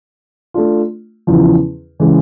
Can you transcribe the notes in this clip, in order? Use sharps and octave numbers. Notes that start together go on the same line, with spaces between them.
A3 D4 F4
E2 C#3 F3
C#3 E3 G#3